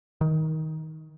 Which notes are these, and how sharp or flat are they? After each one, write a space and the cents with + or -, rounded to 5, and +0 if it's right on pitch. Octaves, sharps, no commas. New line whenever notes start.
D#3 +15